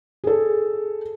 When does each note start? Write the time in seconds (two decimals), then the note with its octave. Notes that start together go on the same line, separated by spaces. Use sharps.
0.24 G#4 A4